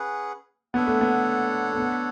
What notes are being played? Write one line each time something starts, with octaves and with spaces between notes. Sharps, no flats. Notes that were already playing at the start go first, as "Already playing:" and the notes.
Already playing: C#4 G#4 B4 F#5
B3 D4 A4 C#5 F#5
A3
B3
A3
B3